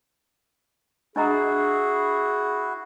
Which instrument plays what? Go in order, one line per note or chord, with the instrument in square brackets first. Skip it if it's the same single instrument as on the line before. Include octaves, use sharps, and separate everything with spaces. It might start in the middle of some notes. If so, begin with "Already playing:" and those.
[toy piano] D4 D#5 A#5 [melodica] E4 F#4 [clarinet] G#4